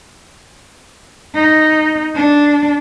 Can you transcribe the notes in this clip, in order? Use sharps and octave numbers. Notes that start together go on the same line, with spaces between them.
D#4
D4